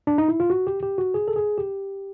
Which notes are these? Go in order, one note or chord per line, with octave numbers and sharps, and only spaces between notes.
D4
D#4
E4
F4
F#4
G4
G4
F#4
G#4
A4
G#4
G4